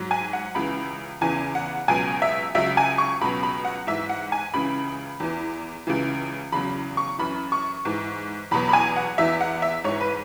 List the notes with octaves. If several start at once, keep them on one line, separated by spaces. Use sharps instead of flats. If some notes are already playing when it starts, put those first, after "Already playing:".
Already playing: G#2 F#3
G#5
F#5
C#2 C#3 E3 B5
E2 C#3 E3 G#5
F#5
C#2 B2 F#3 G#5
E5
C#2 C#3 F#3 E5
G#5
C#6
C#2 B2 F#3 B5
B5
F#5
G#2 E3 E5
F#5
G#5
C#2 C#3 E3 B5
E2 E3
C#2 C#3 E3
E2 C#3 F#3 B5
C#6
F#2 E3 B5
C#6
G#2 E3
E2 B2 F#3 B5
B5
G#5
F#5
E2 E3 E5
F#5
E5
G#2 E3 C#5
B4